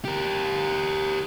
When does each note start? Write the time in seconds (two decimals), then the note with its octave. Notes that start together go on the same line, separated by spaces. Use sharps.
0.05 G4 A#4